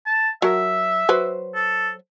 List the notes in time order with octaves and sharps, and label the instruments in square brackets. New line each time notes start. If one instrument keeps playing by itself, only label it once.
[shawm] A5
[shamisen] F#3 A#4 [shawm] E5
[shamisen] F#3 B4 C5
[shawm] A4